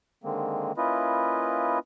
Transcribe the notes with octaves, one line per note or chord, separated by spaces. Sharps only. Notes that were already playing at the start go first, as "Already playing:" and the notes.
D3 D#3 G#3 A#3 C4
A#3 C#4 E4 F4 B4 D#5